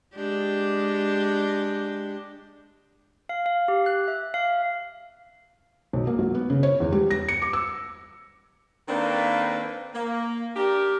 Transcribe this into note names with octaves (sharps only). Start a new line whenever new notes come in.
G#3 D4 G4
F5
F5
G4
F#6
E5
F5
B1
A#3
F#3
B3
C#3
C#5
E2
G3
A#6
C#7
D6
E6
D#3 A#3 C4 D4 A4 B4
A#3
D4 G4 A#4